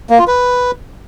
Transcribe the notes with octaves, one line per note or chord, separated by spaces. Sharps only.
A#3
F4
B4